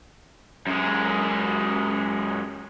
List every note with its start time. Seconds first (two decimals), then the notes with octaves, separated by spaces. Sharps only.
0.67 F#2 G#3